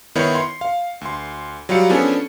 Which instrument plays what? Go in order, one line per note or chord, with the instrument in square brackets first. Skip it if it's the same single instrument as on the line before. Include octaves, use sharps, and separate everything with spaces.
[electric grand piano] D#3 B3 D#4 E4 C#5 C#7
C6
F5
D2 C6
F#3 G3 F4 F5 C#7
F3 B3 C#4 D4 G#4 A4